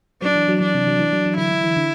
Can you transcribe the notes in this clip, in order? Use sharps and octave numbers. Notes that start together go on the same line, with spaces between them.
F#3 D4
E3
F#3
E3 D4
C3
F#3
E3
F#3
E3
D3 E4
D3
E3
D3